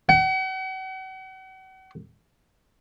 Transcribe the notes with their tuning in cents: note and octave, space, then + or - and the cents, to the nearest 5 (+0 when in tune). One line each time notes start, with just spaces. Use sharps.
F#5 +40